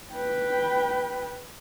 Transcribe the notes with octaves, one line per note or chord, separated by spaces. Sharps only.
B4 G5